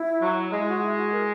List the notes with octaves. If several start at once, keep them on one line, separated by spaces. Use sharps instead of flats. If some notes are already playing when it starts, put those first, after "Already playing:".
Already playing: E4
F#3
G#3 E4
F#4
E4
F#4
A#4